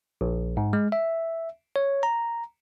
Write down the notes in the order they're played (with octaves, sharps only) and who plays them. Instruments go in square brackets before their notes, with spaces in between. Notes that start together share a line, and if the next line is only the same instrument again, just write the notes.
[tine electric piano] A#1
G#2
G#3
E5
C#5
A#5